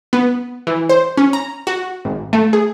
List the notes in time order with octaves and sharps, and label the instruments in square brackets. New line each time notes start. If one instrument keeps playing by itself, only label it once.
[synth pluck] B3
E3
C5
C#4
A#5
F#4
G#1
A3
G#4